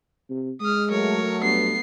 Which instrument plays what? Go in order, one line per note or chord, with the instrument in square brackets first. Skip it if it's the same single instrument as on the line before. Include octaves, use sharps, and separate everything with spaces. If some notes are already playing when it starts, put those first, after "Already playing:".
[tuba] C3
[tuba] G#3 [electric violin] D#6 F6
[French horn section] F#3 A3 [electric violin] A#4 C#5
[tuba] G2 [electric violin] B3 C7